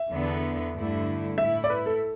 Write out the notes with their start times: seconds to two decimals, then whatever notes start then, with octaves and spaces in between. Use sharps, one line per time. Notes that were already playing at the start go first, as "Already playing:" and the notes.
Already playing: E5
0.10 E2 D3 B3
0.74 G2 D3 A3 E4
1.38 A2 A3 E4 E5
1.64 D5
1.70 B4
1.86 A4